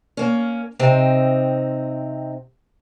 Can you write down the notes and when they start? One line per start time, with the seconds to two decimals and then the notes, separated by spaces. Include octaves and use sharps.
0.17 A#3 C#4
0.79 C3 C4 D#4